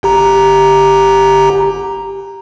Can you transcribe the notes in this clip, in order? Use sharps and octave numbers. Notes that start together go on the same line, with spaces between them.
G1 G4 A#5